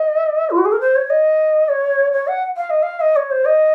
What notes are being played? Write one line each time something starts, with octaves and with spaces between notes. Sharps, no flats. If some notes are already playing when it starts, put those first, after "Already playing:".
Already playing: D#5
F4
F#4
G#4
A#4
C5
C#5
D#5
C#5
C#5
F#5
F5
D#5
F5
D#5
C#5
C5
D#5